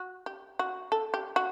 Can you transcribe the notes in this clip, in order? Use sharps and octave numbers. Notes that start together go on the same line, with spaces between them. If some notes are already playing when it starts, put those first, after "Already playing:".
Already playing: F#4
G4
F#4
A4
G4
F#4